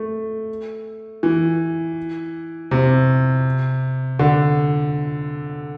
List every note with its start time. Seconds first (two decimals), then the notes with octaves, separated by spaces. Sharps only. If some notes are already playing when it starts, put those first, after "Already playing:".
Already playing: A3
1.23 E3
2.71 C3
4.19 D3